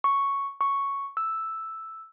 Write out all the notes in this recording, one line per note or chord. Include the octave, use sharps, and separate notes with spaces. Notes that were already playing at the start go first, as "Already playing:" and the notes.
C#6
C#6
E6